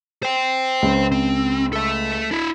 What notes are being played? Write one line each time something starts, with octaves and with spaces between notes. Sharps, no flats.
C5 G5
C#2
C4
A4 E5
D4 E4